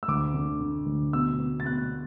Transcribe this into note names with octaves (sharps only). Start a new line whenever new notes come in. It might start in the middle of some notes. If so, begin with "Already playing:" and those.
E6
D2 D6
D3
D3
D2
B2 E6
B2
A6
B2 F#6